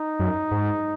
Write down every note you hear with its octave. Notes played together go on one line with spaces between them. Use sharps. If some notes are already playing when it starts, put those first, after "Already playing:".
Already playing: D#4
F#2
G#2